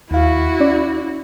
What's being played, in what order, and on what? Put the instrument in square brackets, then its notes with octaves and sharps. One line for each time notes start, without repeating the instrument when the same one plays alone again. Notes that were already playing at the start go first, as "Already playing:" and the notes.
[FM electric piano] D#2 F5 [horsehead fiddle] E4 F#4
[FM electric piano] C#4 D5